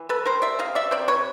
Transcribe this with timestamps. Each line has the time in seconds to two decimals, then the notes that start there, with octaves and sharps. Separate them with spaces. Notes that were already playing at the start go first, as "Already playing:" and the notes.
Already playing: E3
0.09 A4 B4
0.25 G3 A#4 C5
0.42 D5 E5
0.59 C3 D#5 F5
0.75 D5 E5
0.91 C3 C5 D5
1.08 B4 C#5